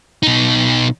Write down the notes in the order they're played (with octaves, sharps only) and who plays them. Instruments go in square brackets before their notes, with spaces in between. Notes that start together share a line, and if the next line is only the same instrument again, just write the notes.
[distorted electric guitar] B2 D#4